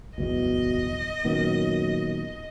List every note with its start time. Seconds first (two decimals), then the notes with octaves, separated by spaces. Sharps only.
0.18 D1 G1 E2 B2 D#5
1.24 F#2 A#2 D#3 B3